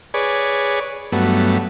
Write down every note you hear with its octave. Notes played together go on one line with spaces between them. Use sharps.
G#4 B4 C#5 D5
G2 F#3 A3 B3